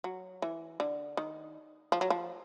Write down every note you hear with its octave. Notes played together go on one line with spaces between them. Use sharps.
F#3
E3
D3
D#3
F3
F#3
F3